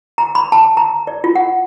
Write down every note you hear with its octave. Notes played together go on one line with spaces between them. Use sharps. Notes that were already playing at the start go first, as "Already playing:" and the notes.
A#5
B5
A5
A#5
D5
F4
F#5